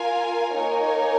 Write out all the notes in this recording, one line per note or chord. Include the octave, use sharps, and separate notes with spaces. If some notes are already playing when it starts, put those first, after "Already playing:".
Already playing: F4 A#4 F5 G#5
A#3 D#4 A#4 C#5 G#5